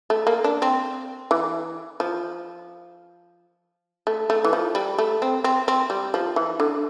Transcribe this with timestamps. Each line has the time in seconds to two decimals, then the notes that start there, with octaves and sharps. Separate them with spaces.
0.10 A3
0.27 A#3
0.44 D4
0.62 C4
1.31 E3
2.00 F3
4.07 A3
4.30 A3
4.44 E3
4.53 F3
4.75 G3
4.98 A3
5.22 C4
5.44 C4
5.68 C4
5.90 G3
6.14 F3
6.36 E3
6.60 D3